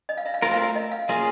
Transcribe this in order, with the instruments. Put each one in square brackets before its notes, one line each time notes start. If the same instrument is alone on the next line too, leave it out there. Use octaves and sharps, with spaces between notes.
[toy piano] D#5
F5
E5
F5
[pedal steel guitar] A3 C4 F4 A#4 [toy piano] E5
[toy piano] F5
E5
D#5
F5
[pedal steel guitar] A#3 C#4 F4 G#4 [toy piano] E5